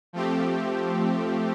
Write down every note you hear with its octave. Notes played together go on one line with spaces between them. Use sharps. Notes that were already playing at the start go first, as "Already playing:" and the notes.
F3 A3 C4 G4